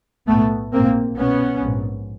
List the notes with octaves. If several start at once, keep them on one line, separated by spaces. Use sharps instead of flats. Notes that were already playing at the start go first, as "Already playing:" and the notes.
B1 A2 A3 B3
A#1 G#2 A#3 C4
C2 B2 B3 C#4
A#1 G#2